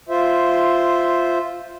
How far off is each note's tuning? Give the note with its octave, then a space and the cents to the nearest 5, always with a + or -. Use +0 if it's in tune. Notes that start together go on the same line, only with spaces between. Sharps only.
F4 +0 C5 -5 E5 +0